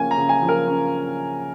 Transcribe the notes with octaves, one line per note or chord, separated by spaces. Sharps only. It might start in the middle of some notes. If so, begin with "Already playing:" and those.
Already playing: C#3 F3 A#3 C#4 G#5
A#5
C#3
G#5
F3
A#4
C#4